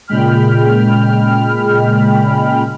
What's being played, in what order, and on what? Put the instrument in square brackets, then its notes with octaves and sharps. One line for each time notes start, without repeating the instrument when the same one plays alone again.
[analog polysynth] A#2 C#3 G#3 G5 B5 F6